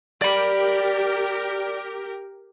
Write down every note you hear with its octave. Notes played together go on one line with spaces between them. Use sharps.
G4 A#4 D5 B5